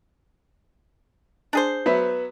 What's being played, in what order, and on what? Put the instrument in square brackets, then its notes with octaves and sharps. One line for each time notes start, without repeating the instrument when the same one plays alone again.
[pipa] D4 G#4 C5
[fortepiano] F#3 B3 E5 [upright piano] B4